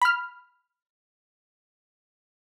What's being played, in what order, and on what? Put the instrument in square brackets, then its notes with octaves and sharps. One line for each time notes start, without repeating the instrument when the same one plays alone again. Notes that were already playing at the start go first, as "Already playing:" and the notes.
[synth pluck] B5 F6